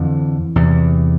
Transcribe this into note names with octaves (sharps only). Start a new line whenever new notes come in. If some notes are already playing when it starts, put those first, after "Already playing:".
Already playing: F2 D3 E3
E2 C3